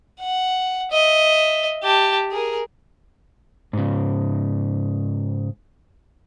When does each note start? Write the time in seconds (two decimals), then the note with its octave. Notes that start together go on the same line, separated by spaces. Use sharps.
0.21 F#5
0.92 D#5 E5
1.83 G4 A5
2.31 G#4 A#4
3.73 G#2 C#3